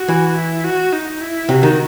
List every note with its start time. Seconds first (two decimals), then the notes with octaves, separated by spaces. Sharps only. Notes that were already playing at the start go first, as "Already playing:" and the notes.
Already playing: F#4
0.08 E3
0.36 E4
0.64 F#4
0.93 D#4
1.21 E4
1.49 C3 F#4
1.63 D#3